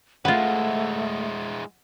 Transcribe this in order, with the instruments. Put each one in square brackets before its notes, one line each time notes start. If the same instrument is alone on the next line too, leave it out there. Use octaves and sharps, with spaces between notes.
[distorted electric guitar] G#3 E4 [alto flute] A3 [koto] F4 B4 [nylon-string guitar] F#5